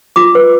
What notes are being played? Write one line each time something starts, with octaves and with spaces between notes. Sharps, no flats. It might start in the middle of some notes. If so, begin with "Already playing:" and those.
F4 D6
B4